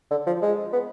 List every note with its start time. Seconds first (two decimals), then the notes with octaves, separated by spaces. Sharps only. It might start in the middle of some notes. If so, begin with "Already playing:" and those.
0.11 D3
0.27 F3
0.42 G#3
0.73 B3